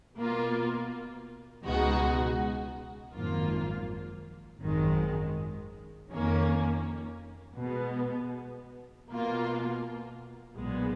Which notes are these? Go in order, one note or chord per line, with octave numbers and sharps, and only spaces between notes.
B2 A#3 F4
C#2 B2 G#3 D#4 F#4
G#1 F#2 F3 A#3 F4
G#1 F#2 D#3 G#3
F2 D#3 A#3 C#4
B2 G#3 B3
B2 A#3 F4
B1 A#2 G#3 B3